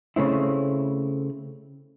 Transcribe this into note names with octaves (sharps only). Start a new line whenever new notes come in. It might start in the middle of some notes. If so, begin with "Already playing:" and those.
C#3 A3 C4 E4